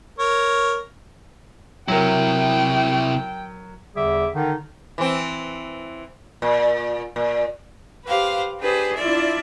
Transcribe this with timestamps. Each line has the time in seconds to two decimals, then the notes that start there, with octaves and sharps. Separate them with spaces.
0.19 A#4 C#5
1.88 C3 F#3 E4 A#4 G5
3.96 E2 D3 G3 G#4 E5 D6
4.34 D3 D#3 D#4
4.98 E3 C4
6.42 A#2
7.16 A#2
8.07 G4 B4 C5 F5
8.60 D4 G4 G#4 B4 C5
8.97 D4 E4 F4 D5 E5